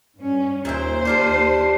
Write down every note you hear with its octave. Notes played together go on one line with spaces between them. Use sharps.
G2 C#4
D#2 A#2 C5 E5 G5
D4 F4 G4 C7